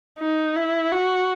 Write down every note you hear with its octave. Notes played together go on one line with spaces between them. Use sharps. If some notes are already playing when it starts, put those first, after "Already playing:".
D#4
E4
F#4